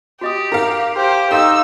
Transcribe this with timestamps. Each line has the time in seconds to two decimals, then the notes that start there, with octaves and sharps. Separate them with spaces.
0.21 F#4 G4 D#5 D#6
0.52 D#4 A#4 F5
0.96 G4 C5
1.31 D#4 A4 D#5 F5 C6 E6